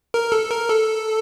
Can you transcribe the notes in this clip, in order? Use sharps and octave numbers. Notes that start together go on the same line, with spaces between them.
A#4
A4
A#4
A4